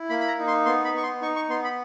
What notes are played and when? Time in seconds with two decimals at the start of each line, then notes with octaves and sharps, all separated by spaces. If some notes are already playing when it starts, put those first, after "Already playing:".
Already playing: E4
0.09 A#3 B5
0.20 B5
0.28 A#5
0.38 D#4
0.47 C6
0.65 B3 C6
0.85 B5
0.94 B3 C#6
1.03 C6
1.21 D#4 C#6
1.36 C#6
1.49 B3 C6
1.64 B5